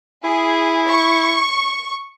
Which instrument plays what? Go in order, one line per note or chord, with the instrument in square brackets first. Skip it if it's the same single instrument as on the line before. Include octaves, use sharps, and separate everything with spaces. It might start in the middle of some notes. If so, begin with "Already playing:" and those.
[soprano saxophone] E4 [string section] G#4
[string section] C#6